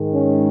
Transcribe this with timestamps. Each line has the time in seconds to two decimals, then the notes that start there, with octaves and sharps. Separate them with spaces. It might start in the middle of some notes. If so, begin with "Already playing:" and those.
Already playing: G#2 D#3 G#3
0.11 C#4